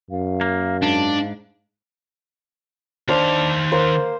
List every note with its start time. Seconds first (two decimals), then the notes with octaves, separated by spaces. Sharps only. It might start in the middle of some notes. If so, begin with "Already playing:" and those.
0.11 F#2 F5
0.41 A#3
0.82 G#2 D4
3.09 D#3 D4 C5 F5
3.72 A#3 C5